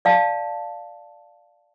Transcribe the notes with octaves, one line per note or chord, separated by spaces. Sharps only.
D5 F5 A5